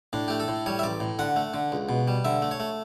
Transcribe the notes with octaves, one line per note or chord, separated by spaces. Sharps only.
A2 D4
A3 G4
A4
A2
G3 C#5
E5
A1 D5
A2
D3 F#5
A3
D3
C#2
B2
G3
D3 E5
A3
C#5
A3